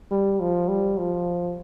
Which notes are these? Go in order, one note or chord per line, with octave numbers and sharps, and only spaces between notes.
G3
F3
G3
F3